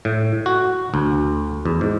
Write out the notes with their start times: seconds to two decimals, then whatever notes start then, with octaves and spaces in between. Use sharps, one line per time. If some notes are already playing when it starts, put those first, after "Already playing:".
0.05 A2
0.46 F#4
0.94 D2
1.65 E2
1.81 G#2